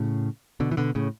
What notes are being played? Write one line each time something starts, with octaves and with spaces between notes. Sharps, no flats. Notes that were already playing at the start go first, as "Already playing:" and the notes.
Already playing: A2 C#3
B2 D3
E3
B2 D3
A2 C#3